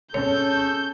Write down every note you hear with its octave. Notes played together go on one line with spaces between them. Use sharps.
C#4 G#4 A4 C#5 G6